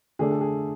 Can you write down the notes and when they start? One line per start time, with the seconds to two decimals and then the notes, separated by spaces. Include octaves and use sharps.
0.19 D3 A3 D4 G#4
0.31 A4
0.41 G#4